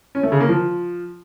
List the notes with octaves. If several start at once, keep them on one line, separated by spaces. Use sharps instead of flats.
C#4
A3
C#3
A#3
F3